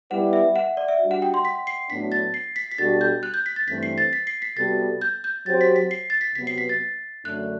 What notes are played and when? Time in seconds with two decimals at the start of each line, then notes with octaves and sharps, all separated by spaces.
0.10 G3 B3 E4 B4 F#5
0.33 E5
0.56 F#5
0.77 D5
0.88 E5
0.99 G3 D4 F#4
1.11 F#5
1.22 G5
1.34 C6
1.45 B6
1.67 C7
1.89 A2 F#3 B3 D4 B6
2.12 A6
2.34 C7
2.56 B6
2.71 B6
2.78 B2 G3 D4 F#4 A4 A6
3.01 G6
3.23 F#6
3.34 G6
3.46 B6
3.56 A6
3.68 G2 E3 A3 C4 B6
3.83 C7
3.98 A6
4.13 B6
4.27 C7
4.42 B6
4.57 C3 G3 B3 F#4 A4 A6
5.01 G6
5.24 G6
5.46 F#3 C4 G4 C5 A6
5.61 B6
5.76 B6
5.91 C7
6.10 A6
6.21 B6
6.35 C3 F#3 B3 B6
6.47 C7
6.58 B6
6.69 A6
7.25 F#2 D3 A3 D4 F#6